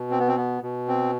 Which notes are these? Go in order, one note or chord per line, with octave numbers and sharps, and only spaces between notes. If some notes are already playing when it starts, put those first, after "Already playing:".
Already playing: B2
C4
B3
C4
B3
B2
C4